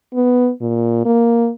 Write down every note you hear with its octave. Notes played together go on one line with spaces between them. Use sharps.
B3
A#2
A#3